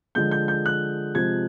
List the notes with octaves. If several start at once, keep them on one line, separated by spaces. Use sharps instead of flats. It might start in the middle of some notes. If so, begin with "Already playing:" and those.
D3 F3 G#3 G6
G6
G6
F#6
C3 F3 G#3 G#6